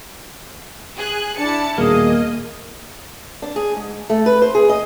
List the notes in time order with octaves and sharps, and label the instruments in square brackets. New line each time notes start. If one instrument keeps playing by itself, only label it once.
[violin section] G#4 F#6
[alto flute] D4 [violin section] E4 A5 C#7
[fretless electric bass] D#1 B2 [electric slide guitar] A#3 [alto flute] G#4 [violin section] D#5
[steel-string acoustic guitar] D4
G#4
G#2
A3
B4
C5
G#4
D#5